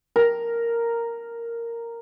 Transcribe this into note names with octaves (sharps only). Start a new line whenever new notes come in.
A#4